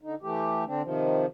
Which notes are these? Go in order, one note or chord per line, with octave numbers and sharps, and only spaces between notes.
D3 D#4
E3 A3 G4
D3 C4 D4
C3 D#3 F3